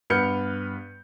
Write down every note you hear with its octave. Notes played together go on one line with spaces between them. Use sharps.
G2 B3 B4 F6 G6 C#7